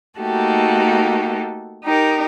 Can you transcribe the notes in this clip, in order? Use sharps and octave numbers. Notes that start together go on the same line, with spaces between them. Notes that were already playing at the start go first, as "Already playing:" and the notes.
A3 A#3 D#4 F#4 G4 A4
D#4 G4 A#4